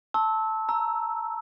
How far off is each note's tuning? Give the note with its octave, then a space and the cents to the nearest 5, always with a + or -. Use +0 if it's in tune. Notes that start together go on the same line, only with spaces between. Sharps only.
A5 +0 C6 +45 E6 -20
A#5 +0 E6 +0